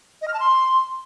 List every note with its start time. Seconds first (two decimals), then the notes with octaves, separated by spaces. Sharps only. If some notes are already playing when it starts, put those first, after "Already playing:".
0.22 D#5
0.28 F6
0.34 A5
0.40 C6